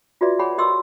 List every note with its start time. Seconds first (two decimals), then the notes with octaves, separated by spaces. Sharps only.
0.21 F4 F#4 G#4 B4 D5 E5
0.39 G#4 C#5 F#5 G#5 B5
0.58 G4 G#4 A#4 D#5 C6 E6